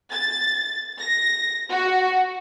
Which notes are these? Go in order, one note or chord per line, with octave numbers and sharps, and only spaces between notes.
A6
A#6
F#4